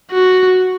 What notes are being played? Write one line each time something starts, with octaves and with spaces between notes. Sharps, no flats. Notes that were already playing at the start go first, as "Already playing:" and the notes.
F#4